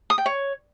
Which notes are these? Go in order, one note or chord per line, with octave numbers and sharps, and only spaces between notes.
D#6
G5
C#5